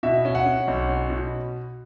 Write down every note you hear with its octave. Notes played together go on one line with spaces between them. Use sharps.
B2 E5
C#4
F#5
C#4
B1
C#4
B2